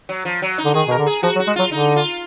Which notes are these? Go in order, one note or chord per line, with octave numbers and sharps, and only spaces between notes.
F#3
F3
F#3
D#4
D3
D#3 G#4
B2 A#4
D3
G#4
F3 F#4
F#3
F#4
G#3
F#3 F4
D3 D#4
F4